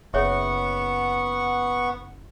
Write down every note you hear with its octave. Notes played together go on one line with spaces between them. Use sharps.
F#1 B3 G#4 C#5 E5 F#5 C#6